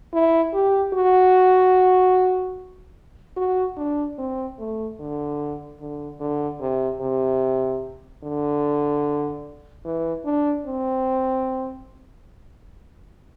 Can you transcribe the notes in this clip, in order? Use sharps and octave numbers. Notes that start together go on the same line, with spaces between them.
E4
G4
F#4
F#4
D4
C4
A3
D3
D3
D3
C3
C3
D3
E3
D4
C4